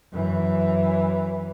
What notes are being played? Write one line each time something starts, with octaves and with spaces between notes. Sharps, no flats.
F#2 E3